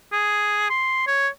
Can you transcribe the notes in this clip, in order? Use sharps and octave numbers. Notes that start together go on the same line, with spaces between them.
G#4
C6
C#5